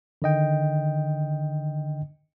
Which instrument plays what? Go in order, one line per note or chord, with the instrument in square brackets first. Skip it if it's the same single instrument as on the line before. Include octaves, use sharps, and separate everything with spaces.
[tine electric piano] D3 D#3 D#5 G5